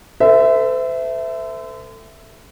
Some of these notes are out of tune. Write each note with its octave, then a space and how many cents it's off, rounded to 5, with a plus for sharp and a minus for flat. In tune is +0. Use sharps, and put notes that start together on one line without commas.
A4 +25 C5 -40 E5 +0